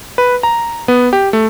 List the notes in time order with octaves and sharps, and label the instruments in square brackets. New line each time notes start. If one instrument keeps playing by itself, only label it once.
[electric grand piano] B4
A#5
B3
G4
A3